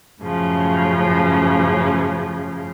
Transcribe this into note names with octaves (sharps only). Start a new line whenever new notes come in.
F#2 A2 C#3 F3